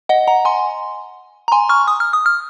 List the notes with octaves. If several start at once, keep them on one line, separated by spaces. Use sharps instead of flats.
D#5 F#5
F#5 A#5
G#5 C6
A#5
G#5 C6
C#6 F6
D#6
F6
D#6
F6